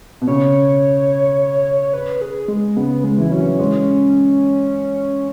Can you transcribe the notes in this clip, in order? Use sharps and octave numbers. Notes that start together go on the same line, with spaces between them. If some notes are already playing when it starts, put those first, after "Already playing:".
B2
C#3 C#5
B4
G#4
G#3
C#3 B3
G#3
E3 E4
F#3 C#4
E3
G#3